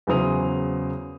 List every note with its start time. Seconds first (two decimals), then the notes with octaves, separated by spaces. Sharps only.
0.07 E2 C#3 F#3 C5 D#6 F7